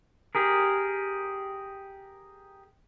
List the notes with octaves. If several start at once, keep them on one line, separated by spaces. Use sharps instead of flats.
G4 G#4 A#4